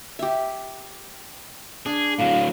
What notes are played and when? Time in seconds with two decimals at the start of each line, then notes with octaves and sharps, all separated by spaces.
0.19 G4 E5
1.86 D4 G#4
2.19 A2 F#3 F5